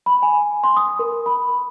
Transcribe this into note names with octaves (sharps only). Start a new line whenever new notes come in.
B5
G#5
C6
D#6
A#4
B5